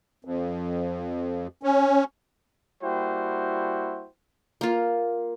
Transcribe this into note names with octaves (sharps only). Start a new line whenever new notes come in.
F2
C#4
G3 A#3 E4 F#4 C5 G5
A#3 F4